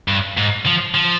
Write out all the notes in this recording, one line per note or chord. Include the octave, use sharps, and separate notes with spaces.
G2
G#2
F3
F3